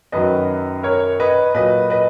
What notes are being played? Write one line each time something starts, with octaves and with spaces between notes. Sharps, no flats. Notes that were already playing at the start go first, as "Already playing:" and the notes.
F#2 D#3 F#3 B4 D#5
A#4 C#5
B4 D#5
A#2 F#3 B4 D#5
B4 D#5